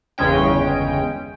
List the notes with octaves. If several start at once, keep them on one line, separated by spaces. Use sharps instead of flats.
G1 E2 C#3 G#3 C#4 G5